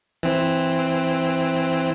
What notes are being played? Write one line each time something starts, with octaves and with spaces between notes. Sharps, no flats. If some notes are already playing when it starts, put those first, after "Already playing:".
E3 C4